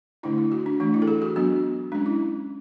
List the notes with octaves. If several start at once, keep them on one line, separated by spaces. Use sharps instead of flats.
D3 A3 D4 E4
E4
F#4
D4
E3 A3 D4
E4
A4
G#4
F#4
F#3 B3 D4 F#4
G#3 C#4 D4
E4